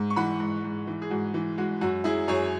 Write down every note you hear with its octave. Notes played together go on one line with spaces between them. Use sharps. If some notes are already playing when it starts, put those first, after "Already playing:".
Already playing: G#2
C#6
E3 F#5 B5
G#2
G#2
E3
G#4
G#2 F#4
E3
G#3 F#4
F#2 F#4
F#3 E4 G#4
F#2 G#4 C#5